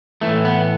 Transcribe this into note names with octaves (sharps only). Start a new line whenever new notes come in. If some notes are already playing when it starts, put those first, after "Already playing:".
A2 E3 A3
B3